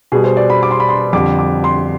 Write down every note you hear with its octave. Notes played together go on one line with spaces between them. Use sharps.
B2 G3 G#4
C5
D5
B5
D6
C6
B5
C6
F2 D3 G3 D6
D6
C6